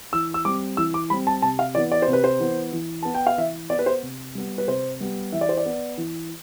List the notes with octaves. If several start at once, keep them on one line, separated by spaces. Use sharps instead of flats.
E3 E6
E6
G3 C4 D6
E3 E6
D6
G3 C4 B5
A5
C3 A5
F5
E3 B3 D5
D5
C5
C3
B4
C5
E3 B3
E3
B3 A5
G5
F5
E3 E5
B3 D5
B4
C5
C3
G3 B3
B4
C3 C5
G3 B3
E3 E5
D5
C5
D5
B3
E3